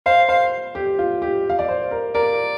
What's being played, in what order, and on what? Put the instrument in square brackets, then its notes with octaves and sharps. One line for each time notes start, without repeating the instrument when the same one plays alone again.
[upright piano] C5 [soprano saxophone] F5
[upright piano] C5 [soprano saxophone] F5
[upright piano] G4
F4
G4
F5
D5
C5
A#4
[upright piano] A#4 [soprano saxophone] D5